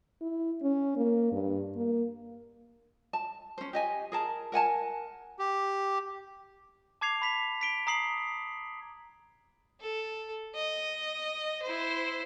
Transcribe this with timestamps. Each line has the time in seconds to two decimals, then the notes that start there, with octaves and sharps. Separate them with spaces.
0.21 E4
0.63 C#4
0.97 A#3
1.32 G2
1.76 A#3
3.13 A5
3.58 C#4 C5
3.73 G4 D#5 G#5
4.12 G#4 A#4 A5
4.52 A#4 F#5 G#5 A5
5.39 G4
7.01 A5 D6 G#6 C7 F7
7.22 B5 B6 F7
7.61 B6 D7 G7
7.87 A#5 D#6 C7 F#7
9.80 A4
10.55 D#5
11.62 E4 C5